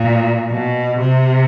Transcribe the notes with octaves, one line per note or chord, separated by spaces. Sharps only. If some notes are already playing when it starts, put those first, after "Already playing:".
Already playing: A#2
B2
C3